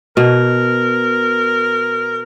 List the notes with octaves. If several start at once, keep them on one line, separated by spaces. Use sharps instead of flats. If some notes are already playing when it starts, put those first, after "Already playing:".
B2 A#4